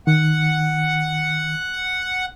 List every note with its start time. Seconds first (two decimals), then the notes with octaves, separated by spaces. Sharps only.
0.07 D#3 F#5